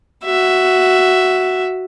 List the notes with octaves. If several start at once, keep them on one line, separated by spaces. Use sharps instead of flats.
F#4 E5